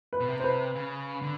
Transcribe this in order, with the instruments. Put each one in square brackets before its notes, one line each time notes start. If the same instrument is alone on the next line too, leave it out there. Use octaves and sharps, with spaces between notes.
[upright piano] B4
[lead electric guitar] B2
C3
[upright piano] C5
B4
[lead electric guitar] C#3
D3